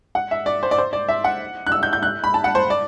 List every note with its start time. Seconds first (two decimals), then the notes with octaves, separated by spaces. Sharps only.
0.15 F#5
0.31 E5
0.46 D5
0.63 C5
0.71 D5
0.78 C5
0.93 D5
1.08 E5
1.24 F#5
1.67 F#6
1.72 E6
1.83 G6
1.93 G6
2.03 F#6
2.24 B5
2.34 A5
2.44 F#5
2.55 C5
2.70 D5